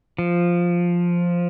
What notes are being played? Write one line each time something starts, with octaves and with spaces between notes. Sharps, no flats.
F3